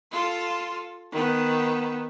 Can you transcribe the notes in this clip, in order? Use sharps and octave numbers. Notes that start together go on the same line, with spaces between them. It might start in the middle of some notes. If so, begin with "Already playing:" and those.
F4 A4
D#3 B3